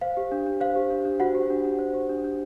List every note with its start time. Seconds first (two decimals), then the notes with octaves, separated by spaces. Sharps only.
0.01 C5 F5
0.17 G4
0.32 D4
0.46 D4
0.61 C5 F5
0.76 G4
0.90 D4
1.05 D4
1.20 F#4 C5 F#5
1.35 G4
1.50 D4
1.65 D4
1.79 C5
1.94 G4
2.09 D4
2.24 D4